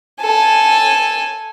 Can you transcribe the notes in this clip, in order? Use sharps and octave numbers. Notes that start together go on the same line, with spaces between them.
A4 G#5